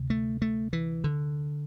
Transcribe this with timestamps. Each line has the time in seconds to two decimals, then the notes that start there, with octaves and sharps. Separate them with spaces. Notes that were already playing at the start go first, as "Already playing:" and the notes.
Already playing: D2 C3
0.10 A3
0.42 A3
0.73 E3
1.04 D3